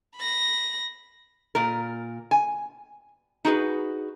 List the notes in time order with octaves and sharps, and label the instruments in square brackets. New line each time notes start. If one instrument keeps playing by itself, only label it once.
[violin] B5 A#6
[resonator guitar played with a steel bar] A#2 A#4
G#5
D#4 F#4 G#4 B4